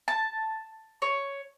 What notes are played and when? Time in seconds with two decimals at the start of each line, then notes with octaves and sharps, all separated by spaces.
0.08 A5
1.02 C#5